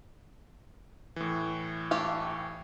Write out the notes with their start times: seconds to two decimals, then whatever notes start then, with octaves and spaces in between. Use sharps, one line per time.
1.16 A2 E3
1.91 A3 G4 F5